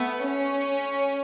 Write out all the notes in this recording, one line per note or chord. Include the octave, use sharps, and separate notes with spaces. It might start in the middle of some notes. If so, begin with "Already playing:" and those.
Already playing: A3 B3
C#4